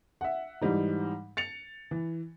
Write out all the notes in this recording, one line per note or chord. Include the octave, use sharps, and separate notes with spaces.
E5 F#5
G#2 E3 G3 D#4
A6 C#7 F7
E3